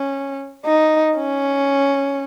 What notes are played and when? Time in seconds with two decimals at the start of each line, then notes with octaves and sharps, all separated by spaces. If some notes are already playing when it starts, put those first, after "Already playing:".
Already playing: C#4
0.65 D#4
1.16 C#4